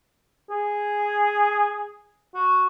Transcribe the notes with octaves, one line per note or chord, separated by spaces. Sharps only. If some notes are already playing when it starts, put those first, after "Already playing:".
G#4
F#4